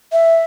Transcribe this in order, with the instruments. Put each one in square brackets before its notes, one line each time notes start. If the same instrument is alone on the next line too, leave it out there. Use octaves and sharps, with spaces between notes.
[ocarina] E5